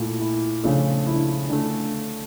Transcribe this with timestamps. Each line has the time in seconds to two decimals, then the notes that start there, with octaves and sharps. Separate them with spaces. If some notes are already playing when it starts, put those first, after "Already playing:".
Already playing: A#2 A3 E4
0.20 E4
0.64 C#3 F3 A3 D4
1.07 E4
1.15 D4
1.25 E4
1.50 D3 A3 D4